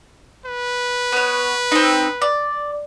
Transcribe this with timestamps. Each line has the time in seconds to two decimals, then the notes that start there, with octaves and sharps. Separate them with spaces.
0.46 B4
1.12 B3 C#5
1.72 C4 D#4
2.22 D5